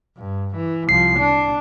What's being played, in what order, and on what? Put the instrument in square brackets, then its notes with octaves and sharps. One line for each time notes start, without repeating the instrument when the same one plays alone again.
[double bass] G2
E3
[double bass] C2 F3 [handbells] C7
[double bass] D4